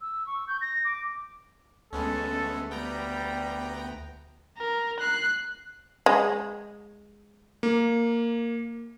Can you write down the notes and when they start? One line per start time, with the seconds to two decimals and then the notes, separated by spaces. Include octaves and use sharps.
0.01 E6
0.27 C#6
0.48 G6
0.61 A#6
0.85 D6
1.93 D2 G#3 B3 C#4 A4
2.70 G3 B3 G5 A#5
4.58 A#4
5.00 F#6 C7
6.06 G#3
7.63 A#3